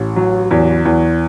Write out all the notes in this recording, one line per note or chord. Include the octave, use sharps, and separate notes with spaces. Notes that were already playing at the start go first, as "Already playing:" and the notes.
Already playing: A1
F#3
E2
E2